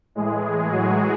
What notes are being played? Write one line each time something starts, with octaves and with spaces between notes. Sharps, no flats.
A2 E3 G#3 G#4
F#3 F#4